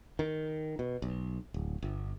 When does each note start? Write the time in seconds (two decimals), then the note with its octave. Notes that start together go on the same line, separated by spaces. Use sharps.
0.19 D#3
0.79 B2
1.02 B1
1.54 D1
1.82 G1